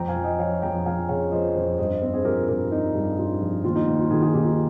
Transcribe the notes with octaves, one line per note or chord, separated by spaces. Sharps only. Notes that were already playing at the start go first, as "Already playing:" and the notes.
Already playing: F2 G5 A#5
F5 G#5
F3
D#5 G5
F3 C#5 F5
F2 G5 A#5
F3 F5 G#5
C#3 C#5 F5
F3 C5 D#5
F2
G2 C5 D#5
C4
G#4 C5
F3 G4 A#4
G2 G4 A#4
G2 D#4
G2
G2 F4
F3
D#2 F4
D#4
D#2
F4
D#3 F4 G#4
F4 G#4
D#2 D#4 G4
F4